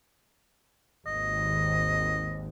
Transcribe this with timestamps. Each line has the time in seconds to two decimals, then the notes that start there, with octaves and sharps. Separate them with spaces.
1.07 G#1 D#2 D#5